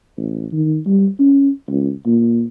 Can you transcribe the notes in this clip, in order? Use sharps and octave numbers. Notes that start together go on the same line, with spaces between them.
A1
D#3
G3
C#4
C#2
A#2